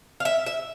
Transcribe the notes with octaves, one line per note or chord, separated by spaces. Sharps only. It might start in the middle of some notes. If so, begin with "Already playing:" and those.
F5
E5
E5